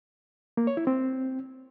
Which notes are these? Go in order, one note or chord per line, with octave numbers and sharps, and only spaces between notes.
A#3
C#5
E4
C4